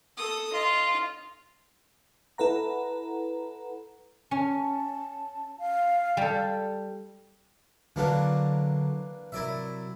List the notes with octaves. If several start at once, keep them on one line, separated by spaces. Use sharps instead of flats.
A4 D#6
F4 D#5
E4 A4 B4 F#5 A#5
C#4 A5
F5
G3 A4
D3 E3 F#3 A#3 D4 A4
C3 F#3 E4 A#4 D5 E5